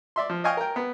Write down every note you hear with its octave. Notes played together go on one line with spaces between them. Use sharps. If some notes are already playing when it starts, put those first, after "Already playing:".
D5 E5 C6
F3
D#5 F5 G5 G#5 C#6 F6
A#4 G5
B3